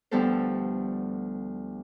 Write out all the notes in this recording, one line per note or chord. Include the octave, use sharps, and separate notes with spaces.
D2 F3 G3 B3 A4 C5